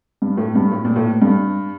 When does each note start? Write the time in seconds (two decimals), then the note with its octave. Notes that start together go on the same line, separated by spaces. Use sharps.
0.22 G2
0.37 A2
0.55 G2
0.72 A2
0.85 A#2
0.96 A2
1.22 G2